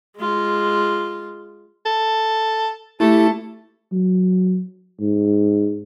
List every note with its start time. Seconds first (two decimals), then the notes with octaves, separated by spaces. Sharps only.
0.17 G#3 F4
1.86 A4
3.00 A3 E4 G4 A4
3.92 F#3
5.00 G#2